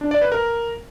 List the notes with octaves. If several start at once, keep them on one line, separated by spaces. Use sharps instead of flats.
D4
D5
B4
A#4